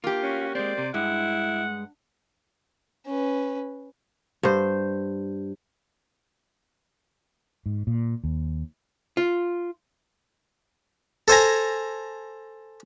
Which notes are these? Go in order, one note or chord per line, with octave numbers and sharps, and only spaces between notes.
A#3 F4 G4
C#4 F#4
G#3 C4 C5 D5
C3
G2 G#3 E4 F#5
C#4 B4
G2 C5
G#2
A#2
D#2
F4
A4 C5 G#5 A#5